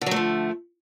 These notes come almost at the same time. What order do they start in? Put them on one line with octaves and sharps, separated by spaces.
D3 F#3 A3 F3